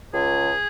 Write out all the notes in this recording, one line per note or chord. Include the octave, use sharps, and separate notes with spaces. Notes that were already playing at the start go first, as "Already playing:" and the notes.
C#2 G#4